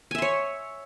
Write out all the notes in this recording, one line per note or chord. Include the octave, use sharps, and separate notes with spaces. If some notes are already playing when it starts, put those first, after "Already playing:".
C#5 E5 G#5 C6